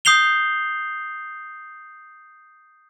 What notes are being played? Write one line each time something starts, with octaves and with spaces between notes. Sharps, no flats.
D#6 G6 C7 F7 G7